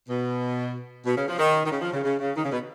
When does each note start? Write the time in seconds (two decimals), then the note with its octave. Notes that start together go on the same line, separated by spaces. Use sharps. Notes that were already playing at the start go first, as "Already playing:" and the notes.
0.09 B2
1.06 B2
1.17 C#3
1.28 F3
1.39 D#3
1.65 D#3
1.71 C#3
1.82 F3
1.93 C#3
2.04 C#3
2.20 C#3
2.36 D#3
2.44 C#3
2.52 B2